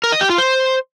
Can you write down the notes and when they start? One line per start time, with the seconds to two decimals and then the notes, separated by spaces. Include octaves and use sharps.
0.04 A#4
0.12 D#5
0.21 G4
0.30 F4
0.38 C5